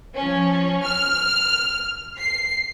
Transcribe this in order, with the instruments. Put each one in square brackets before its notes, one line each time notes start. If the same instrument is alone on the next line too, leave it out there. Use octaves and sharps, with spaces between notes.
[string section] F3 C#4
F6
C7